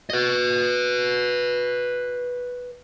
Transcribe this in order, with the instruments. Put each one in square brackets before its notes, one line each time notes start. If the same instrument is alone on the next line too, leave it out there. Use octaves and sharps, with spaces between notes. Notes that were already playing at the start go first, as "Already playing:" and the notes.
[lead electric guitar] B4 D#5